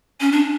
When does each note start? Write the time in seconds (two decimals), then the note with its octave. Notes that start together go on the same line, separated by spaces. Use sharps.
0.21 C#4
0.32 D4